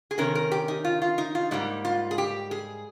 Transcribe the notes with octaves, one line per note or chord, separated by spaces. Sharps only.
G#4
C3 D#3 C#4 A#4
A#4
G4
D#4
F4
F4
D#4
F4
G#2 G3 A#3 D#4
F4
G#4
G4
G#4